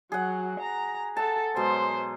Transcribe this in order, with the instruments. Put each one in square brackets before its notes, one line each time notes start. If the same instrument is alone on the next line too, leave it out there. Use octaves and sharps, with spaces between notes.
[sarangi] F#3 [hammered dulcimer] G#4 F#5
[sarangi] A#5
[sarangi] A4 [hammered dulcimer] F#5 A5
[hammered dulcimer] B2 F#3 G#3 [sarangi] C5